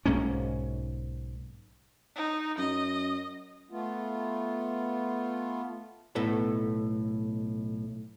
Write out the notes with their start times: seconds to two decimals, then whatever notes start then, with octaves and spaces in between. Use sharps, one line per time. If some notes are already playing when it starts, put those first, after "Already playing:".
0.06 B1 G#2 A#3 C#4
2.16 D#4
2.58 F#2 D#5
3.71 A3 B3 F4
6.15 B1 A2 A3 B3 A4